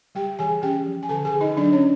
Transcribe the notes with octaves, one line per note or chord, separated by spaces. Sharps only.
G3 G4 G5
E3 G#4 G#5
C#4 G4 G5
F3
G#5
D3 A4 A5
G#4 G#5
D3
D#4 D#5
F#3 D4 D5
C#4 C#5